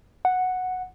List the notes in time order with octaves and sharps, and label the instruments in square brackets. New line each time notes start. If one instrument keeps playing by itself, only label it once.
[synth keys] F#5